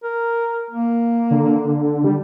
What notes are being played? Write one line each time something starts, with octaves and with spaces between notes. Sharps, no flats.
A#4
A#3
D3
G3